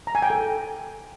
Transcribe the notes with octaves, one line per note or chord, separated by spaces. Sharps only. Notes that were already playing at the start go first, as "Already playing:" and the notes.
A#5
G#5
G5
A4